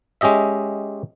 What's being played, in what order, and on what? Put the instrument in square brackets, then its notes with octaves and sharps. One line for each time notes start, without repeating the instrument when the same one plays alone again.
[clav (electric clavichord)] G#3 C#4 G4 D#5 E5